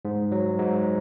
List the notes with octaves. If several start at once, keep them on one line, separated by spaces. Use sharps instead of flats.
G#2
F#3
G#2